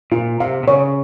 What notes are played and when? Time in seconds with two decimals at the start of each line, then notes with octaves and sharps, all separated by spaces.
0.12 A#2 F4
0.40 C3 F5
0.63 C3
0.68 C#3 C#5